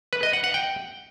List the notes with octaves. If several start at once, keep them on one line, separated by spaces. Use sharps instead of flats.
B4
D#5
F#5
F#5
G5